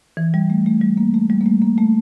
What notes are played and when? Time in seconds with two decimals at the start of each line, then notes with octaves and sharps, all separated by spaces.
0.17 E3
0.34 G3
0.50 A3
0.66 A3
0.81 G3
0.97 A#3
1.14 A3
1.30 G3
1.41 A#3
1.46 A3
1.62 A#3
1.78 A3